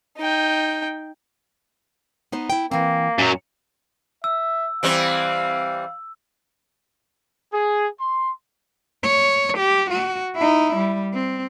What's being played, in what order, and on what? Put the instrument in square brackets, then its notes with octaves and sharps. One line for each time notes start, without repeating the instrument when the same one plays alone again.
[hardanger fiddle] D#4 G5
[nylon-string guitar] B3 D#4 C5
E4 G5
[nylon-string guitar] E3 C4 [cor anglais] A#3
[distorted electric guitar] F#2 F#3 [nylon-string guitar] A#2
[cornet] E5 [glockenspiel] E6
[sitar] E3 G3 C4 [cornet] F5
[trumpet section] G#4
C6
[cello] C#5
G4
F#4
D#4 E4
G3
C4